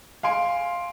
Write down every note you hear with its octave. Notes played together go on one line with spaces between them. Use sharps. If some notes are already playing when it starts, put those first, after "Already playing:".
F5 G#5 C6 D7